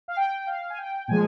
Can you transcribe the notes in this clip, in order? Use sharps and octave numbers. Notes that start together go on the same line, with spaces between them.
F5
G5
F5
G#5
G5
A#2 F3 G#3 G#5